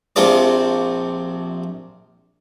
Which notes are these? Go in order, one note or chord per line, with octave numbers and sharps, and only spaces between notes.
A#1 C3 F3 F4 D5